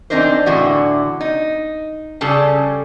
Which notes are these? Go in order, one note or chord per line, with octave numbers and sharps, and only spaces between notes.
E3 C4 D4 D#4 A#4 C5
A2 D3 E3 E4 F#4
D#4
C#3 G3 C#4 G#4 A4 A5